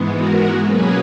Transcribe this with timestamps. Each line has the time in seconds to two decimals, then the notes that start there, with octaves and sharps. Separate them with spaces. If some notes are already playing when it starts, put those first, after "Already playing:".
Already playing: G#2 E3 G#3 B3
0.15 F#4 A#4
0.63 B2 F#3 A#3 C#4 G#4 B4